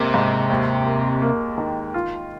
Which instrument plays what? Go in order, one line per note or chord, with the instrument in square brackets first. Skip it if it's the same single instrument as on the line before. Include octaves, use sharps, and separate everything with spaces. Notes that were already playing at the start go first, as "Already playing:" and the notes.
Already playing: [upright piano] G#1 A#3 [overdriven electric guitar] C3
[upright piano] G#2
D#2
A#3
A#3
D#3
F4